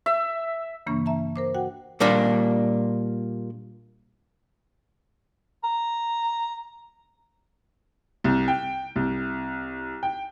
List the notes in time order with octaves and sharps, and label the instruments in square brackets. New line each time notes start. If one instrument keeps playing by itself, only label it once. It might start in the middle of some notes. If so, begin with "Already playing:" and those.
[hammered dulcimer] E5
[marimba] G2 C#3 E3 A#3 D4 C#6
E5 A5 A#5
A#4 C5 D6
F#4 F#5 G5
[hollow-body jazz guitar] A#2 G3 A#3 D4
[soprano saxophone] A#5
[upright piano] C2
G5
C2
G5